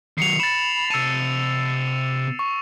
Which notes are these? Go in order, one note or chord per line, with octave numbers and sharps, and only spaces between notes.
D#3 F#3 C7 C#7 F7
B5 A6 E7
C3 A5 E6 C#7 D#7
C#6